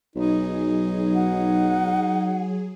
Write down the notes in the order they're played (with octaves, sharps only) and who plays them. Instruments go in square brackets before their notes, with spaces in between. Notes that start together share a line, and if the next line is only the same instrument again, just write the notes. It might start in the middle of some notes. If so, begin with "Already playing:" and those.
[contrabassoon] B1 [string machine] F#3 G#4 [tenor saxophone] D#4
[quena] F#5